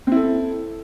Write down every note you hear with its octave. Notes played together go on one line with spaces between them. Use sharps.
C4 E4 A4